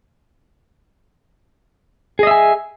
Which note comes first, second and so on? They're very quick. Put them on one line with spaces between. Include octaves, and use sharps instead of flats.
G#4 D#5 E5 G#5